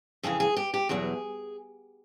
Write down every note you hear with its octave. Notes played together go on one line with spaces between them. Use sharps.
F2 C#3 E3 G#4
G#4
G4
G4
E2 B2 F#3 G#4